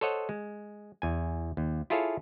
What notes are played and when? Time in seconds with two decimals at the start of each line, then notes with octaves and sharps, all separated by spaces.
0.01 A4 C5 C#5 D#5 F#5
0.29 G#3
1.02 E2 G#5
1.57 D#2
1.90 E4 F4 G#4 A4 C#5 F5